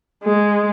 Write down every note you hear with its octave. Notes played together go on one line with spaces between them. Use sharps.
G#3